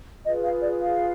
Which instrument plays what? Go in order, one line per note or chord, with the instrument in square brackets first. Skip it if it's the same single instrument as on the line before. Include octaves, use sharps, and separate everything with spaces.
[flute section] F4 G#4 B4 D#5
F5
D5
F5